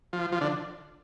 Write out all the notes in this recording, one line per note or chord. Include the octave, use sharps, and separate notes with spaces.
F3
F3
D3